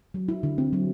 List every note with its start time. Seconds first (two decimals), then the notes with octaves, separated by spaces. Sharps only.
0.14 F#3
0.29 E4
0.43 D3
0.58 C4
0.73 F#3